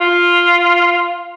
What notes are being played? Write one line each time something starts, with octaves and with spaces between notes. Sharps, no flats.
F4